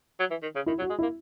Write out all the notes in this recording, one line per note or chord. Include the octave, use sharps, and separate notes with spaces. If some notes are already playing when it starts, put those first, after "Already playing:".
F#3
E3
D#3
C#3
D#3 E4
F#3
F#4
G#3
E4
A#3